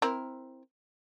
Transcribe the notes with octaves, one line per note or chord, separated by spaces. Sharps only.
C4 E4 A#4